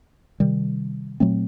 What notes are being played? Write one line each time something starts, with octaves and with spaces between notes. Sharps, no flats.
C3 D#3 G3
A#2 F#3 A3 C4